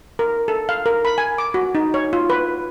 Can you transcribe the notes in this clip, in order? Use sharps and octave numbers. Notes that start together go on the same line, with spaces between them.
A#4
A4
F5
A#4
B5
G#5
D6
F#4
D#4
C#5
F4
B4